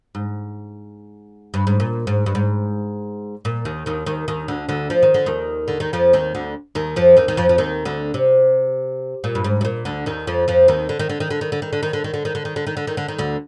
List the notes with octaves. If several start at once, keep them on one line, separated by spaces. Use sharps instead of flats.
G#2
G2
G#2
A#2
G#2
G2
G#2
A#2
D#2 D#3
D#2 D#3
D#2 D#3
D#2 D#3
D2 D3
D2 D3
F3
D#3
D3
D#2 D#3
D3
D#3
F2 F3
D#2 D#3
D2 D3
D#2 D#3
F2 F3
D#2 D#3
D#3
F2 F3
F3
D#2 D#3
D2 D3
C3
A#2
G2
G#2
C3
A#2
D2 D3
D#2 D#3
F2 F3
F2 F3
D#2 D#3
D3
D#3
D3
D#3
D3
D#3
D3
D#3
D3
D#3
D3
D#3
D3
D#3
D3
D#3
D3
D#3
D3
D#3
D3
D#3
D2 D3